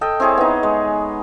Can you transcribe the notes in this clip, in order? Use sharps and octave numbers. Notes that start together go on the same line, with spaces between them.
A4 D#5 G5
C4 E4 G#4 C#5
B3 D#4
G#3